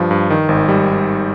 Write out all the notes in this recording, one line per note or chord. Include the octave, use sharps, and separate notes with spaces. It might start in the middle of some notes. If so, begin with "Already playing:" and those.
Already playing: G2 F3
G2
D#3
G#1
G3